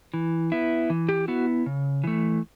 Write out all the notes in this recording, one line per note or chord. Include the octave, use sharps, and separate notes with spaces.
E3
B3 E4
E3
G4
B3 E4 F#4
C#3
E3 A3